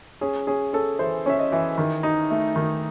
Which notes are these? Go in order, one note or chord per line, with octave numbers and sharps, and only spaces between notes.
C#4 G#4
C#4 G#4
C#4 A4
E3 C5
C#4 E5
D#5
E3
D#3
D#4
A3
D#3